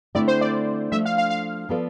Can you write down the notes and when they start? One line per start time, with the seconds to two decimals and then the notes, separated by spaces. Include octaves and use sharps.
0.15 D3 A3 C4 E4 D5
0.28 C5
0.41 D5
0.92 F3 A3 D4 E5
1.05 F5
1.18 F5
1.30 F5
1.69 F3 B3 F4 A4 D5